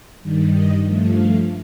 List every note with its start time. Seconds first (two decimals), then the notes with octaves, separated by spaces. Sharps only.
0.21 G2 D#3 G3
0.52 D#5
0.82 G2 F3 A3
1.12 F5